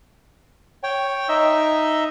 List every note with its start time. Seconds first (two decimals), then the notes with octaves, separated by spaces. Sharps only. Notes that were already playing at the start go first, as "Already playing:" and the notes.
0.83 C#5 G5
1.29 D#4 D#5 E5 E6